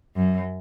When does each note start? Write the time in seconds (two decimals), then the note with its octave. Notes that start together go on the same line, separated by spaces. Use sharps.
0.15 F#2